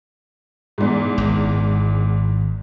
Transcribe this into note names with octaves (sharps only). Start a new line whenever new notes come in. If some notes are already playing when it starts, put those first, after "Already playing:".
E2 G#2
G#1